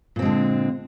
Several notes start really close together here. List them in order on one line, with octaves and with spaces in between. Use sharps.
A#2 C4 G#3 D3